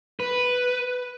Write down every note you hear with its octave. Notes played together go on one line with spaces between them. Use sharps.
B4